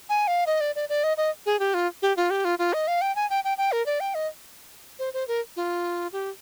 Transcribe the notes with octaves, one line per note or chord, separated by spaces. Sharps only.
G#5
F5
D#5
D5
D5
D5
D#5
D#5
G#4
G4
F4
G4
F4
G4
F4
F4
D#5
F5
G5
G#5
G5
G5
G5
A#4
D5
G5
D#5
C5
C5
A#4
F4
G4